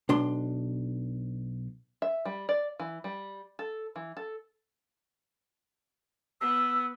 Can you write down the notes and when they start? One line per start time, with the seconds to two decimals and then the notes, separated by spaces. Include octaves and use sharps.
0.09 B1 D4 C6
2.02 E5
2.25 G3
2.49 D5
2.80 E3
3.04 G3
3.59 A4
3.96 E3
4.17 A4
6.41 B3 E6